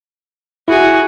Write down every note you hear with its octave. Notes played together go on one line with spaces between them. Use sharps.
E4 F#4 G#4